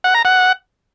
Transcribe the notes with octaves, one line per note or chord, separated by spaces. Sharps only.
F#5
A#5
F#5